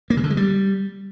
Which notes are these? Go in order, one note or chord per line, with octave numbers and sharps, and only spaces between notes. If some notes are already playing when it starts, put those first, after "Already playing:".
A#3
C#3
D3
G#3
G3